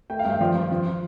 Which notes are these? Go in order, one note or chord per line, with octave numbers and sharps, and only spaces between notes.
A3 G5
F5
G2
G5
F3 D5
G2
F3